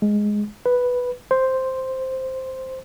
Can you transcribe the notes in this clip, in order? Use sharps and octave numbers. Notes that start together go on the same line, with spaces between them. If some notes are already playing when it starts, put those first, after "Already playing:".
G#3
B4
C5